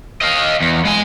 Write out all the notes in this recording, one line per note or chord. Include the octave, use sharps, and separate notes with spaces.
D#5 F5
E2
G#3 G#5